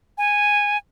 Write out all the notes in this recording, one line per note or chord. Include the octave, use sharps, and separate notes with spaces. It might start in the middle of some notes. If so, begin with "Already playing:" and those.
G#5